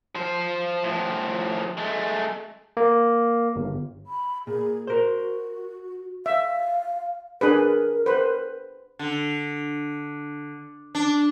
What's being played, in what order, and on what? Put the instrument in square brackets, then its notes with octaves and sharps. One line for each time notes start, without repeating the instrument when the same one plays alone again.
[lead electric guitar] F3 C5
A2 F3
G#3 A3
[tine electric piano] A#3
G1
[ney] B5
[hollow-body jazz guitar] A#2 [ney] G#4
[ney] F#4 [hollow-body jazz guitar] A#4 C5
[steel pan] E5 [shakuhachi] F5
[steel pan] D4 G#4 B4 [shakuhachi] A#4
[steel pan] B4 C5
[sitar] D3
D4